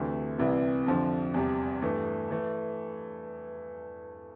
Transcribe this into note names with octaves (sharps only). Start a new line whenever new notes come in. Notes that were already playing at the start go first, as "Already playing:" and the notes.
Already playing: D2 C3 E3 A3 D4
C2 C3 E3 B3 E4
F2 D3 F3
E2 C3 G3
G2 E3 A3
E3 A3